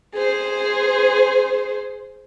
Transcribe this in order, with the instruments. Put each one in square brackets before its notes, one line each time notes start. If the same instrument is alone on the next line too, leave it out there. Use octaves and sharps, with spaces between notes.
[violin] G#4 C5